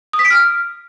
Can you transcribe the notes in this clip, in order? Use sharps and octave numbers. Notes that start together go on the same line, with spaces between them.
D#6
B6
D7
F6